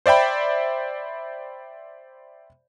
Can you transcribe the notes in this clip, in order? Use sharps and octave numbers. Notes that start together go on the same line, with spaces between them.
C5 D5 E5 G5 B5